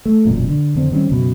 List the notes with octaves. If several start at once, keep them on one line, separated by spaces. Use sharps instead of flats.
A3
E1 F#2 A#2
D3
F2 D3 C4
D#3 G3 C4 C#4
C#2 F#2 B2